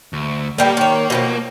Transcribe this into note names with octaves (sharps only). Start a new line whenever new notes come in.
D2
A2 G3 A#3 B3
D#3 C#5
B2 E3 F3